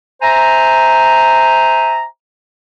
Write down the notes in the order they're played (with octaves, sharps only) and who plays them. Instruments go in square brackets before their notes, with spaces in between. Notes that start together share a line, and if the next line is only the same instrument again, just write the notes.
[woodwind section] C5 E5 G#5 A#5